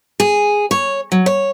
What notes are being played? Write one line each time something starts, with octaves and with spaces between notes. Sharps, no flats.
G#4
C#5
F#3
C#5